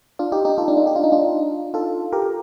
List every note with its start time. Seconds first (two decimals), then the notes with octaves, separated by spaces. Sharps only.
0.19 D4 F4
0.32 D#4 G4
0.45 D#4 G4
0.58 F4 A4
0.68 D4
0.77 D#4
0.87 G4
0.96 F4
1.04 D#4
1.12 D4 F4
1.74 F4 A4
2.13 G4 A#4